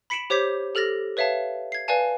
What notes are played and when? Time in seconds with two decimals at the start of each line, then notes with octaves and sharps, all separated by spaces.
0.10 B5 B6 C#7 D7 E7 F#7
0.30 G4 C5 C#5 D6 G6 B6
0.75 G4 A4 F6 A6 A#6
1.17 B4 C#5 E5 F5 A5
1.72 G#6 C7
1.88 B4 D5 F5 G#5 A5